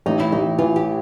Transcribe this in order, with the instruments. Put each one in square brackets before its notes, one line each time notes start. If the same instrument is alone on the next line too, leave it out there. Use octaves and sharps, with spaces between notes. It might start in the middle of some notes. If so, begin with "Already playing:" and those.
[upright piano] A1 [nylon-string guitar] D#4
[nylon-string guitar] E4
[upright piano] A1 [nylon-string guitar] D#4
[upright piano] E3 [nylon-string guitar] F4
[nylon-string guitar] G4